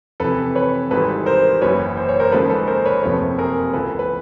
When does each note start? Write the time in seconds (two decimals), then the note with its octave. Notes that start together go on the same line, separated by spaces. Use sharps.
0.20 F2 C3 E3 A4 B4
0.55 B4 C#5
0.91 G#1 G#2 E3 G3 A4 B4
1.26 A#4 C5
1.62 F#1 F#2 C#3 E3 B4 C#5
1.97 C5
2.09 C#5
2.20 A#4 C5
2.32 D#2 C#3 F3 G#3 A4 B4
2.50 A4 B4
2.67 A#4 C5
2.85 B4 C#5
3.03 F#1 F2 C3 F3 A3 B4 C#5
3.38 G#4 A#4
3.73 C#2 C#3 E3 A4 B4
3.99 B4